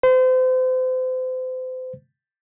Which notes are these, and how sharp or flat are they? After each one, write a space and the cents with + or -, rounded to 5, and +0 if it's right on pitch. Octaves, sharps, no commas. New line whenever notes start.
C5 -35